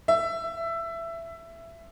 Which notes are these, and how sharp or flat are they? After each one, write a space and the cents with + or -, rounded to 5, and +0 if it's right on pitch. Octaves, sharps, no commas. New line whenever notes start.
E5 +15